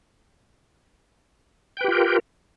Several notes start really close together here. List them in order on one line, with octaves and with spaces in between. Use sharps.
G5 B4 G4 F4 A#4